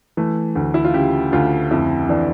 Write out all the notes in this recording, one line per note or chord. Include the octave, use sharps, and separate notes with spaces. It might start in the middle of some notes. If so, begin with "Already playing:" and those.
E3 A3
D2
E4
F4
C#3 G4
D2 F4
F2 E4
E3 D4